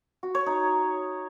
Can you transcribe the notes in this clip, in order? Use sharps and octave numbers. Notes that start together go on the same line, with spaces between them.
F#4
C#5
D#4